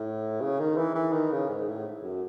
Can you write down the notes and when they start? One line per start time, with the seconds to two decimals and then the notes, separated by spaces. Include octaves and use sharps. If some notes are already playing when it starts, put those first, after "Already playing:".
Already playing: A2
0.41 C#3
0.60 D#3
0.77 E3
0.95 E3
1.13 D#3
1.32 C#3
1.49 G#2
1.68 A2
2.03 F#2